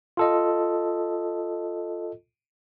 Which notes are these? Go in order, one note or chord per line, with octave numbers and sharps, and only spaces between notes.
F4 A4 D#5